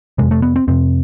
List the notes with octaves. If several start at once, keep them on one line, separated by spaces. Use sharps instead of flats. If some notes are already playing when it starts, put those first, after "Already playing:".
F2 C3 G#3
A3
B3
C4
F2 C3 C4